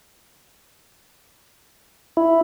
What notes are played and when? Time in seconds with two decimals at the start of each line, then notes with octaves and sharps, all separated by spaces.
2.17 E4